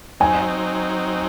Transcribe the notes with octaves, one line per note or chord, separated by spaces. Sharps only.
F#3 C4 D#4 G#5